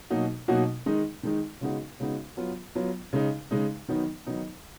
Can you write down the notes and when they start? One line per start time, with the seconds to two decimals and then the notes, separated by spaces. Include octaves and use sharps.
0.10 B2 F#3 A#3 D#4 F#4
0.48 B2 F#3 A#3 D#4 F#4
0.86 D#3 G#3 D#4
1.23 D#3 G#3 D#4
1.61 C#3 G#3 B3 D#4 F#4
2.00 C#3 G#3 B3 D#4 F#4
2.37 F#3 B3 F4
2.75 F#3 B3 F4
3.13 C#3 G#3 D#4
3.51 C#3 G#3 D#4
3.88 D#3 F#3 B3 D#4
4.27 D#3 F#3 B3 D#4